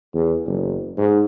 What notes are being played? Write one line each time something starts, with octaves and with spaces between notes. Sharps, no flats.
E2
F#1
G#2